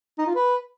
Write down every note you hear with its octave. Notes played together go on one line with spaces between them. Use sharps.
D#4
F4
B4